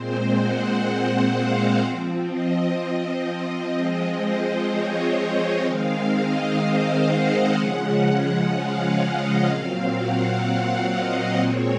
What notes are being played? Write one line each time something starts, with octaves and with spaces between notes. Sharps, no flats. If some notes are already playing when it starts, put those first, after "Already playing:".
Already playing: A#2 G#3 C4 C5
F#5
F#5
F5
F3 C4
D#5
D#5
F3 G#3 C4
C5
C#5
D#5
D#3 G#3 C4 F5
D#5
C5
F#5
C#3 F3 G#3 C#4
F5
D#5
A#2 F#3 C4 F5
F#5
F#5
D#5
A#2 G#3 C4 C#5